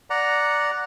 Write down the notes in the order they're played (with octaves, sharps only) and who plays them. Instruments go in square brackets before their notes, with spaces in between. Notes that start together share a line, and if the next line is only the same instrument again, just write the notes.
[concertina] D5 F#5 A#5